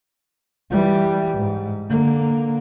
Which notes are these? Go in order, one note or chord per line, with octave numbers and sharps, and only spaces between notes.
E3 G3
G#2
D3 A#3